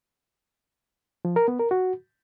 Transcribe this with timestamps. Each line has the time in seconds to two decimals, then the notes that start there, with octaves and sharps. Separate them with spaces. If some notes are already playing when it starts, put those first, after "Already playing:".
1.25 F3
1.36 A#4
1.48 B3
1.59 A#4
1.71 F#4